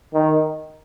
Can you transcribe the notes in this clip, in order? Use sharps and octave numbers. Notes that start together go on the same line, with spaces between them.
D#3